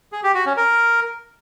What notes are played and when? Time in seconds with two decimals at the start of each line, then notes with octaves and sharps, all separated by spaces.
0.12 G#4
0.24 G4
0.35 F#4
0.46 C#4
0.57 A#4